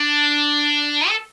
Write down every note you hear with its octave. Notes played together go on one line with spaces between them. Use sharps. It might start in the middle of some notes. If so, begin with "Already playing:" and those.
Already playing: D4
A4